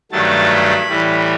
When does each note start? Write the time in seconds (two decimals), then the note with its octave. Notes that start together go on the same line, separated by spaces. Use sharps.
0.12 G2 D#3 F#3 A3 A5
0.51 B5
0.89 A2 E3 G3